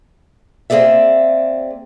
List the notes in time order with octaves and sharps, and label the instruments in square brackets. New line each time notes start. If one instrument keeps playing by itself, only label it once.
[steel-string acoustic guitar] A#3 C4 G#4 D5 E5